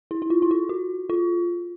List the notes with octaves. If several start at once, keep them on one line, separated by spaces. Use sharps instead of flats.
E4
E4
F4
E4
F4
F#4
F4